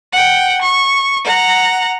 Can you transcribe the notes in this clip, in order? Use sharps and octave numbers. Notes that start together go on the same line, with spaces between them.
F#5 G5
C#6
F#5 A#5